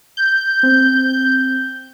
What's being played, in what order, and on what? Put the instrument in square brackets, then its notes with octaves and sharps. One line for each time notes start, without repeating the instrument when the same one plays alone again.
[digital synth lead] G6
[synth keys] C4